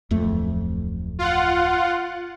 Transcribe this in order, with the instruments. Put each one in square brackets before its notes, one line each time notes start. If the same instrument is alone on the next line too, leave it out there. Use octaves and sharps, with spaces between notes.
[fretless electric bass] D1 F2 A3
[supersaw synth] F4 F#5